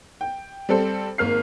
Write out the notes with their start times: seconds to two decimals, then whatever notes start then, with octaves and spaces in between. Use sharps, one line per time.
0.21 G5
0.69 G3 C4 A4 C5
1.18 G#1 A#3 F6 C7